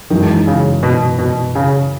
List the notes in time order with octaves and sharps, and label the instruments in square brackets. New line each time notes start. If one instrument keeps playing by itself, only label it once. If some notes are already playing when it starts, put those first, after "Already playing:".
[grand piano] F#2 E3 G#3 D#4 [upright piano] D#3
[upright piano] C#3
B2
B2
C#3